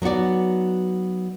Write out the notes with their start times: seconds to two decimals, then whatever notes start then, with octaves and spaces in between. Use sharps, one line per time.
0.02 F#3 B3 D#4 F#4 D5